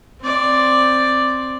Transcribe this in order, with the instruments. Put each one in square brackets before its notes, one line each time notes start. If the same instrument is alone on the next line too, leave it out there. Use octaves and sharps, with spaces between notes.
[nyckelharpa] C4 D5